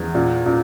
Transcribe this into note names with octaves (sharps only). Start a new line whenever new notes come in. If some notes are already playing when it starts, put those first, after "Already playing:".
Already playing: E2
A#2
A#2